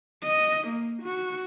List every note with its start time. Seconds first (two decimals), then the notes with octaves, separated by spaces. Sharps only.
0.24 D#5
0.68 A#3
1.03 F#4